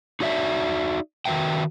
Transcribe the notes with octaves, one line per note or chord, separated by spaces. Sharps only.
D#4 F#4 C#5 D5 E5
D#3 F#4 B4 E5 G5